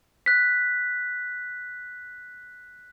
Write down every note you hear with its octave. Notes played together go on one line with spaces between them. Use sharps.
F#6 B6